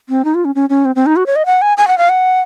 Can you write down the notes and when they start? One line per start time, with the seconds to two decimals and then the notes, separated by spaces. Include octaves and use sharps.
0.09 C4
0.25 D#4
0.35 F4
0.45 C#4
0.55 C#4
0.70 C#4
0.85 C4
0.96 C4
1.06 D#4
1.16 F#4
1.26 C#5
1.36 D#5
1.46 F#5
1.62 G#5
1.77 G#5
1.88 F#5
1.98 F5
2.09 F#5